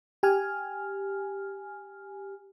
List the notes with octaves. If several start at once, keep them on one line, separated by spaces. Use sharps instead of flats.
G4 G#5 F6